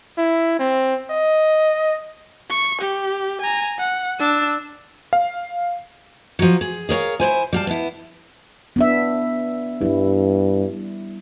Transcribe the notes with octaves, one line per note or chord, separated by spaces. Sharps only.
E4
C4
D#5
C#6
G4
G#5 A#5
F#5
D4 E6
F5
F3 F#3
G#4
G#4 A#4 C#5 F5
E4 C5 G#5
G3 F5 A5
B3 E4
B3 D4 E5
G2 G3 E4